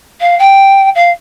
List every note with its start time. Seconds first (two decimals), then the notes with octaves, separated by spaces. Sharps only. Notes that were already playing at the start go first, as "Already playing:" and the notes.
0.20 F5
0.39 G5
0.95 F5